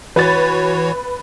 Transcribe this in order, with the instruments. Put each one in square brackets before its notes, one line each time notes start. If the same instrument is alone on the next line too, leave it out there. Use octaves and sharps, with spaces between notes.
[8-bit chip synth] E3 F#4 C#5 [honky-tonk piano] B4 A6